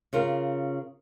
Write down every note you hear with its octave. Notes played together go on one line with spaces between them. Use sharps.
C#3 F4 A#4